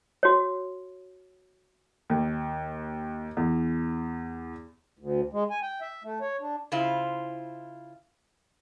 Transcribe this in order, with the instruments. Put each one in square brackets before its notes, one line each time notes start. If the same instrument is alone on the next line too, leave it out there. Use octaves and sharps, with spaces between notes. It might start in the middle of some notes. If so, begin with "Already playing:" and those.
[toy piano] F#4 C#5
[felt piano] D#2
E2
[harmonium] D2
G#3
G#5
G5
E5
A3
C#5
D4
[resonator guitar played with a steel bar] C#3 E4 F4 C5